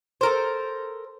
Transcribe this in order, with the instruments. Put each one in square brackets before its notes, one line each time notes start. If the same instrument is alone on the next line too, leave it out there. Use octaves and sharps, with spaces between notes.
[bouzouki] A4 A#4 C5